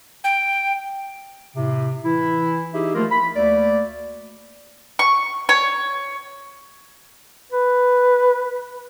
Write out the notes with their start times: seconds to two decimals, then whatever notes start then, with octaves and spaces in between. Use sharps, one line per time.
0.24 G5
1.55 A2 C3
2.05 E3 E4
2.74 D#4 E4 G4 G#4 E5
2.95 F3 A3 A#3 F4 A#4
3.11 B5
3.36 D2 A3 A#3 D5
4.99 C#6
5.49 C#5
7.52 B4